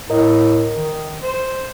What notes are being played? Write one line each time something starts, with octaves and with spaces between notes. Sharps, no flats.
A2 A#4 D#5
D#3
C5